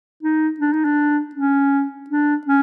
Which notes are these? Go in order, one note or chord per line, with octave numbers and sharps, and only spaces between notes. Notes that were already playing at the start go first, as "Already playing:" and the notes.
D#4
D4
D#4
D4
C#4
D4
C#4